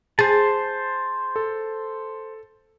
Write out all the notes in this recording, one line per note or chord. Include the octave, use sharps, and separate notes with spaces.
G#4 C5 A5
A4